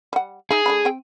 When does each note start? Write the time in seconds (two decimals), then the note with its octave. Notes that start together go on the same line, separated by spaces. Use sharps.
0.13 G3 F#5
0.51 D#4 G#4 E5
0.66 A3 D4 B5
0.85 C4 G5